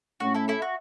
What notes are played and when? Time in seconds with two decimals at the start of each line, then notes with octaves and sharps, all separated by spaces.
0.20 A2 A3 C#4 F#4
0.34 E4 A4
0.48 E4 A4
0.62 F#4